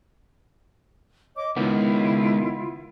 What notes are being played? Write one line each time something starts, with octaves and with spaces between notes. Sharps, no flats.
C#5 D#5 D6
C#2 D#3 B3 E4 F4